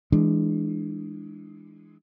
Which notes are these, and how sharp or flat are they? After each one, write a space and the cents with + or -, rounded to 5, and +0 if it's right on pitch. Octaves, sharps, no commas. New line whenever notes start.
E3 -10 G#3 +0 D4 +10